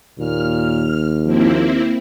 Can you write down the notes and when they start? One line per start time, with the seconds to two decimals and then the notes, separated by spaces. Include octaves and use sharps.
0.19 D#2 A#2 F6
1.26 F3 A#3 C4 E4